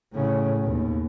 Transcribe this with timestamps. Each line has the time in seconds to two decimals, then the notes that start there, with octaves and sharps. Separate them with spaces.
0.12 A2 C#3
0.62 D#2 B2